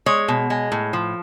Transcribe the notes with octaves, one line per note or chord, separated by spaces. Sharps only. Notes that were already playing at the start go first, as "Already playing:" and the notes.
G#3 C#5
B2
G#3
A2
F3